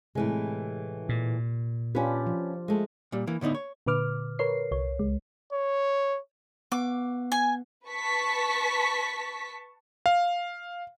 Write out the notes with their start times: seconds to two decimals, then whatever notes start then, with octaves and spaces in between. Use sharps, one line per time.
0.15 A2 C3 E3 G#3
1.09 A#2
1.95 C#4 D4 F4 G4 B4
2.26 F3
2.68 G#3 A3
3.12 A#2 G3
3.27 E3 A#3
3.41 A2 D3 B3 D#4 E4
3.55 C#5
3.86 A#2 D3 B4 D6 F6
4.39 A#4 B4 C#5 C7
4.71 C2 C#5
4.99 C#2 G#3
5.53 C#5
6.72 B3 F#5 D6
7.32 G#5
7.87 B4 A5 C#6 B6
10.06 F5